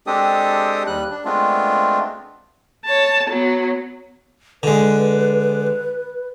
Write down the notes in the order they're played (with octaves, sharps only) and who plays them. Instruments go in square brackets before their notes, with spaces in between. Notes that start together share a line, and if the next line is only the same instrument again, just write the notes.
[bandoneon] G#3 C4 D4 G4 A4 D#6
D#2 G3 F#6
D4
G#3 A3 B3 C4 D4 F4
[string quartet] C#5 A5
F#3 B3
[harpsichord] D3 G#3 [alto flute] B4